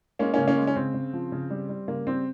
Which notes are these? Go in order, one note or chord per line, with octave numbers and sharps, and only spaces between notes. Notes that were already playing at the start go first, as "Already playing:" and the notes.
G#3 A#3 C#4
C#3 A#3 C#4
A#3 C#4
G#3
C#4
C#3 C4
C#3
F3
C#3
G3
G3
C#3 A#3
G3 C4